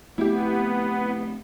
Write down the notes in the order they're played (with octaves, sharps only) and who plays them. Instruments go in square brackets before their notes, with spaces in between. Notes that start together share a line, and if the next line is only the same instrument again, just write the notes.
[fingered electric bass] A3 C4 [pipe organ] B3 [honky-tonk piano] E4 G4